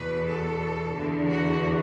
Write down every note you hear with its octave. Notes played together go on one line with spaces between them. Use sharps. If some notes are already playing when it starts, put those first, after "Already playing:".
Already playing: E2 B2 B4
A4
E2 D3
F#4